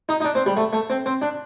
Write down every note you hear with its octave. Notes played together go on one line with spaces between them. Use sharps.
D#4
D#4
D4
C4
G3
A3
A3
C4
C4
D4